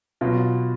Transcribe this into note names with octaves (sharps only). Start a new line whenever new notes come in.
B2 F#3 F4